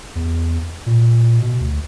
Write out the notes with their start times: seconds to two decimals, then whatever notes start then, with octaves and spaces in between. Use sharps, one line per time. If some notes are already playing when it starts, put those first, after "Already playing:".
0.15 E2
0.86 A#2
1.42 B2
1.60 D2